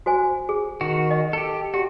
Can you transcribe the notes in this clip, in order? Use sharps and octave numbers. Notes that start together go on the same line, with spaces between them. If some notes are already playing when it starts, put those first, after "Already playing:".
F#4 C5 G#5
G#4
D#3 F#4
D#5
G4 A4
F#4 G4